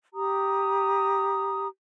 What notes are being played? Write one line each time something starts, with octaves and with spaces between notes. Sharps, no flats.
G4 A#5 D#6